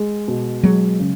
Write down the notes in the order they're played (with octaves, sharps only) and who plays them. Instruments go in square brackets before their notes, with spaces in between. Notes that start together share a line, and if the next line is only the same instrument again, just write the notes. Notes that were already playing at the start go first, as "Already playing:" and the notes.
Already playing: [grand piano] G#3
B2
[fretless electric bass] F#3 [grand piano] G#3
[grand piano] C#3